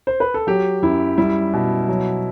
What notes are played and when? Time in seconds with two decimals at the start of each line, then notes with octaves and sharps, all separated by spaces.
0.07 C5
0.20 B4
0.34 A4
0.47 F#3 G4
0.82 F#2 E4
1.18 G3 E4
1.53 B2
1.88 F#3